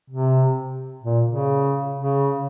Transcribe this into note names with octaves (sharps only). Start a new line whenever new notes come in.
C3
A#2
C#3
C#3